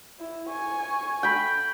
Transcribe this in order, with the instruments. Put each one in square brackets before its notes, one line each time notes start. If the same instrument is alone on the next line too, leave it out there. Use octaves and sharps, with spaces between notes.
[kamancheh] E4
G#5 C#6
[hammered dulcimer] G5 B5